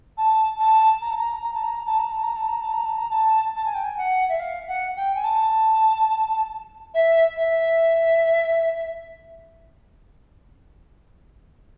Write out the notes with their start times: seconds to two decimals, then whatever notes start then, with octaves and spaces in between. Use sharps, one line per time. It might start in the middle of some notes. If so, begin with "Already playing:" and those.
0.17 A5
0.59 A5
1.01 A#5
1.10 A5
1.18 A#5
1.44 A#5
1.54 A5
1.63 A#5
1.86 A5
1.99 A#5
2.10 A5
2.23 A#5
2.36 A5
2.48 A#5
2.60 A5
2.73 A#5
2.85 A5
2.97 A#5
3.10 A5
3.55 A5
3.65 G#5
3.74 G5
3.84 G#5
3.97 F#5
4.29 E5
4.40 F5
4.68 F#5
4.96 G5
5.15 G#5
5.24 A5
6.94 E5
7.36 E5